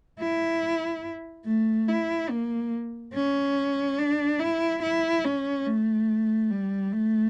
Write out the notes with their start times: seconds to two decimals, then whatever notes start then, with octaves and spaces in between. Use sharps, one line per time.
0.20 E4
1.46 A3
1.89 E4
2.30 A#3
3.14 C#4
3.98 D4
4.40 E4
4.83 E4
5.25 C#4
5.66 A3
6.51 G3
6.92 A3